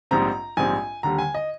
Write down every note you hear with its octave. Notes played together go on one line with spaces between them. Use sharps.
A#1 G#2 G3 C4 A#5
A#1 G#2 G3 C4 G#5
D#2 D3 G3 A#5
G#5
D#5